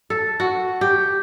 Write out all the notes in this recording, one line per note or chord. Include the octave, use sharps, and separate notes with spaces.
A4
F#4
G4